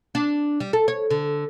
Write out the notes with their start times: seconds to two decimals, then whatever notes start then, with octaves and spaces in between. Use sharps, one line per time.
0.15 D4
0.60 G3
0.73 A4
0.88 C#5
1.10 D3